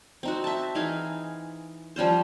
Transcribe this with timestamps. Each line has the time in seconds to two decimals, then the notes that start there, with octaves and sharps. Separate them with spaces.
0.23 C4 D#4 F#4
0.44 E5 A5
0.75 E3 D#4 G#4 F5
1.96 F3 G3 C#4 C5